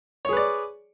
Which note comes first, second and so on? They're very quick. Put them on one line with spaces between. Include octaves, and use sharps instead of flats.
C#5 G#4 B4 D5